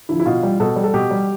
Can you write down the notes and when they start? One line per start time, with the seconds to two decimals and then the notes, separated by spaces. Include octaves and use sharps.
0.09 D3 F3 E4
0.20 E4
0.26 B2 F4
0.43 G3
0.60 B2 A4
0.76 G3
0.84 A4
0.94 B2 G4
1.11 G3